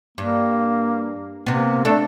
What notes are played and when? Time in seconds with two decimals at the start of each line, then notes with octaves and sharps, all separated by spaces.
0.18 G2 A#3
1.46 C3 A#3 B3
1.85 A3 D4 A4